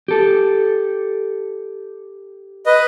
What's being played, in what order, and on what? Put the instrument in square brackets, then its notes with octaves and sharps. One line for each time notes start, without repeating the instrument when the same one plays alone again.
[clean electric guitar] G4 A4
[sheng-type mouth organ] B4 D#5